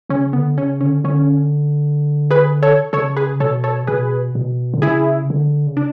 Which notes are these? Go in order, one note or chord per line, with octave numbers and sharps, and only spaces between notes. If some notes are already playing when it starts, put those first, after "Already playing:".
C#3 C#4
D3 B3
C#3 C#4
D3 C#4
D3 C#4
G#4 B4
A4 C#5
C#3 A4 C#5
G#4 B4
B2 A4 C#5
A4 C#5
B2 G#4 B4
B2
D3
C#3 E4 G#4
D3
C#3
D4